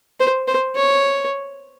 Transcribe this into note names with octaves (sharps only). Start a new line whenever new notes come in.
C5
C5
C#5